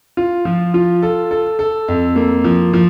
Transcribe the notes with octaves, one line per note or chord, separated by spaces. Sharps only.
F4
F3
F4
A4
A4
A4
F2
A#3
F3
F3